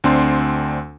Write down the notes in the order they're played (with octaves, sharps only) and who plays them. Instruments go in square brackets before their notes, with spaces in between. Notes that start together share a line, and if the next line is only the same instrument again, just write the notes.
[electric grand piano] D2 C4 D4 C6